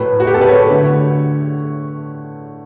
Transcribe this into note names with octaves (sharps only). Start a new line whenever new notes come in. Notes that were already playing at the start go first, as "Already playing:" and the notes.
Already playing: A2 F#3 A3 B4
F#4
G4
A4
B4
C#5
D3 A3